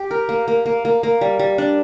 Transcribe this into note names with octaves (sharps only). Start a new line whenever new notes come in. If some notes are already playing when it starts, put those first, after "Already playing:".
Already playing: G4
A#4
A#3
A#3
A#3
A#3
A#3
G3
G3
D4